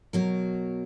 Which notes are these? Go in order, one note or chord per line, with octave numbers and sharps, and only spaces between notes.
B2 F#3 A#4